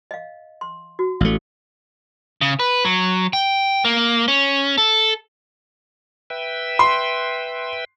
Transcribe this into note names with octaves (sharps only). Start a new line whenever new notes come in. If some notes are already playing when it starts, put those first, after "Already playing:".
D#5 F5
C6
F#4
A1 A3 F5
C#3
B4
F#3
G5
A#3
C#4
A4
B4 E5 G5
C6